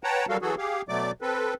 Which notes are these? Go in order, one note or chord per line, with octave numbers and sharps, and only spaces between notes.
B4 C#5 F#5 G5 A5 A#5
F#3 G3 F#4 A4 A#4 F5
E3 F#3 F#4 G#4 A4
G4 G#4 F5
B2 F#3 A3 D5 D6
C4 A4 B4